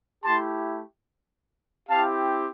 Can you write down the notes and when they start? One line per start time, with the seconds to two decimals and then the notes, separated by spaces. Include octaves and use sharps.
0.24 A3 E4 G4 A5 C6
1.89 C4 E4 G4 F5 A5